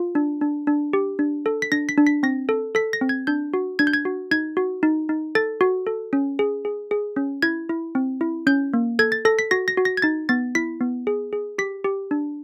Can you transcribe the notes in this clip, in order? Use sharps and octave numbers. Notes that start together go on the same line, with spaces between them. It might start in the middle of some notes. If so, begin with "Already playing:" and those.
Already playing: F4
D4
D4
D4
G4
D4
A4
B6
D4 A#6
B6
D4
B6
C4 A#6
A4
A4 B6
A#6
C4
G#6
D4 G6
F#4
D4 G#6
G6
G#6
F#4
D#4 G#6
F#4
D#4
D#4
A4 A6
F#4
A4
C#4
G#4
G#4
G#4
C#4
E4 G#6
E4
C4
E4
C#4 G6
A#3
A4 G#6
A6
A4 A#6
B6
F#4 A#6
A#6
F#4
A#6
G#6
D#4 A6
B3 A6
E4 B6
B3
G#4
G#4
G4 B6
G4
D4